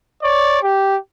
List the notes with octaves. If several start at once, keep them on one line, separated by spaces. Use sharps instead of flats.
C#5 D5
G4